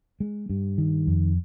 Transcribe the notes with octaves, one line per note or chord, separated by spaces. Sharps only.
G#3
G2
D#3
F2